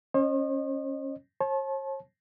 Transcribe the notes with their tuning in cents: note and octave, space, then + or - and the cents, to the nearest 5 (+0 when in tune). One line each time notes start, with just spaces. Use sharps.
C#4 -20 C5 +45 D#5 -30
C#5 -45 A5 -30